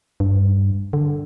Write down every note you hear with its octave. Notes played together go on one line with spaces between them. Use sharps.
G2
D3